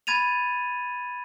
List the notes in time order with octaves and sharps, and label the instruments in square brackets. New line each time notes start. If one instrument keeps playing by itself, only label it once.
[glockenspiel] B5 G#6 A6 D#7 F7